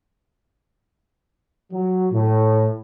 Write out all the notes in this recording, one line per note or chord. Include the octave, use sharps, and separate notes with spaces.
F#3
A2